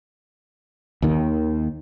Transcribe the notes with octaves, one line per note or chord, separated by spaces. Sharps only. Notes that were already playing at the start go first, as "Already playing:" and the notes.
D#2 D#3